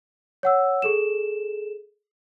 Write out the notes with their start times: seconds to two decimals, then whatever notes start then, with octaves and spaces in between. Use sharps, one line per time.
0.43 C#5 F#5 E6
0.82 G#4 A4 E7